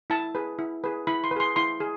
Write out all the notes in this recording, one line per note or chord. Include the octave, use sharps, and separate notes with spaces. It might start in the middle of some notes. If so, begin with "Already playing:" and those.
E4 A5
G#4 B4
E4
G#4 B4
E4 B5
C6
B4
G#4 C6
E4 C6
G#4